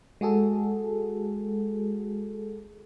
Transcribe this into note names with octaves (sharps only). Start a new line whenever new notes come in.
G#3 F#4 G#4 A4